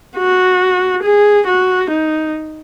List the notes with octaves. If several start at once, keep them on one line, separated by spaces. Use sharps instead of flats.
F#4
G#4
F#4
D#4